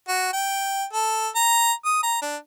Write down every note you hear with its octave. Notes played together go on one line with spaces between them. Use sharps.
F#4
G5
A4
A#5
D#6
A#5
D4